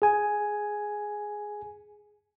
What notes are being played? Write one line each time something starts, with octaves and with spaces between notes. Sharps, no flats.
G#4 G#5